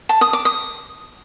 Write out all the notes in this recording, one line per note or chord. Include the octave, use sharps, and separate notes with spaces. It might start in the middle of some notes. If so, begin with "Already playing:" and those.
A5
D#6
D6
D#6